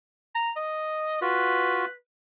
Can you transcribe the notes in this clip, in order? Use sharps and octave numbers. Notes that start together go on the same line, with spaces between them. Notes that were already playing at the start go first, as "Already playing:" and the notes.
A#5
D#5
F4 F#4 B4